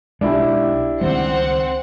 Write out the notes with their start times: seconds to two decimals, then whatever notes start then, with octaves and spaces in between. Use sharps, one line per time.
0.21 B1 G#3 D4 E4 G4
1.01 C#2 D#3 G3 C4 F#5